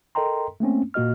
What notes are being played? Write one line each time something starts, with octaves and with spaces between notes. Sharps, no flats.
A4 A#4 D#5 G5 A#5 C6
A3 A#3 C4 C#4
A#2 A#3 F#4 D#5 F6